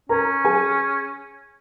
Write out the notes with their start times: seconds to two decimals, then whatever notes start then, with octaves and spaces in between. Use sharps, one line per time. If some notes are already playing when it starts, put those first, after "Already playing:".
0.09 C#4 A#4 A#5
0.45 G#4 G#5